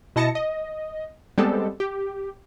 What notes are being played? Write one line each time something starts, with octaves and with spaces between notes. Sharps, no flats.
B2 E4 D#5 A5 A#6 C#7
D#5
G3 G#3 B3 C4 G4 A4
G4